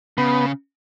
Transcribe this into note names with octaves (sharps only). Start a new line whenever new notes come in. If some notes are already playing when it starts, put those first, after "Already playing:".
C#3 B3